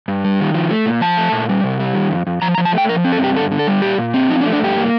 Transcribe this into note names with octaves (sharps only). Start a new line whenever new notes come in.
G2
G3
D#3
F3
A3
A#2
F3 A5
A3
A#2
G3
C3
G3
D#3
F2
F2
F3 A#5
A#5
F3
A5
A3 G5
F3 A#4
C4
A4
G2 G4
D3 A4
D3
A4
G3
A#2 G4
A#2
C4
F3 D#4
D4
A3
D4
G2 G4
A#3